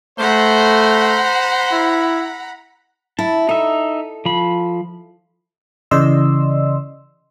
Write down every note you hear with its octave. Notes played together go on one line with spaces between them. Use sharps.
A3 C5 F#5 A#5 B5
E4
E4 A5
D#4 A4 E5
F3 B5
C#3 E3 D5 D#5 C6 E6